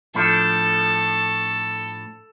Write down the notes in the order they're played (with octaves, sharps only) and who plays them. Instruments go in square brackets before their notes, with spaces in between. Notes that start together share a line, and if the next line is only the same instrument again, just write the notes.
[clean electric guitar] A2 F3 D4 [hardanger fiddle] A4